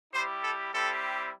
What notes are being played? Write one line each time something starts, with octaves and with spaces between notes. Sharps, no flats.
G3 E4 G4 C5
A4
G3 C4 E4 G4 A4